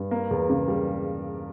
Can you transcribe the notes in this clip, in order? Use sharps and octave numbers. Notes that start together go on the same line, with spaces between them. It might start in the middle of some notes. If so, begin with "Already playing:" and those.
Already playing: G2
A#3
E2
C#3
G3